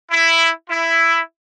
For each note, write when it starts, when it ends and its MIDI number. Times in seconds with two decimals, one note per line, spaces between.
0.11 0.50 64
0.70 1.19 64